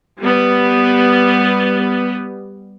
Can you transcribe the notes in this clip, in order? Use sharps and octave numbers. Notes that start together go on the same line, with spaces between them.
G3 B3